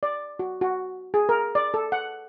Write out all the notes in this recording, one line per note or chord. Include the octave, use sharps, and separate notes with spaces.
D5
F#4
F#4
G#4
A#4
D5
A4
F#5